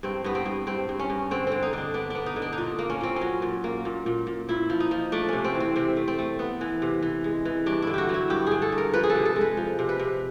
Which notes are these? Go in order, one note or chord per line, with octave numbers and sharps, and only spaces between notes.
G2 C4
G2 B3
C4
G2
G2 C4
G2
C#4
G2
D3 C4
D3 C4
D#4
D3 D4
B3 D4
B3 D4
D#4
D3
D4
D#4
A#2 D4
A#3
C#4
A#2 C4
C#4
F#3
A#2
A#3
A#2
A#2
A#2
A#2 E4
F3
D#4
F3
A3 D4
C3 C#4
C4
E3
C4
C3 C4
A3
C4
A3
B3
E3
C3
E3
G#3
E3
G2 D4
D3 E4
F#4 G4
F#3
E4
G2 G4
D3 G#4
A4
G2
A#4
F3 B4
G#4
A4
C3
A4
G#3
B4
F3
C3
B4
C3